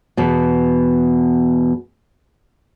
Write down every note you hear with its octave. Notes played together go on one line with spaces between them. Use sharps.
E2 B2